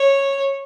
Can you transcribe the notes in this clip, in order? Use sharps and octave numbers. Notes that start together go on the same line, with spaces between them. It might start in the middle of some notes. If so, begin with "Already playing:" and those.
Already playing: C#5